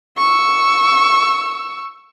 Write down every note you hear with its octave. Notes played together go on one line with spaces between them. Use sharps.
C#6 E6